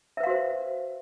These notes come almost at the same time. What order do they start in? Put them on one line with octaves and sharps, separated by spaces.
E5 B4 F5 F#4 C5